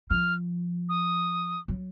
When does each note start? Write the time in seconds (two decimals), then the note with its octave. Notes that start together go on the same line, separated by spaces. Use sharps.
0.10 F3 F6
0.89 D#6
1.68 F#3